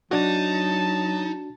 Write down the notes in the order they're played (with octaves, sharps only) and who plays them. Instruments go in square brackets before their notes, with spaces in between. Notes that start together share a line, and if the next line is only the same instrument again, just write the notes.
[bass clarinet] F#3 [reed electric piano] D4 F#4 [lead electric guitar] D#4 [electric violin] A5